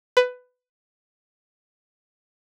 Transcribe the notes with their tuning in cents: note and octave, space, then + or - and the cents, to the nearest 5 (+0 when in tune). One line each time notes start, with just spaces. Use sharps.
B4 +15